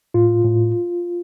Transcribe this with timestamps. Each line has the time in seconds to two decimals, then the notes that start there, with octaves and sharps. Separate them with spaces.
0.14 A2 F4
0.44 A2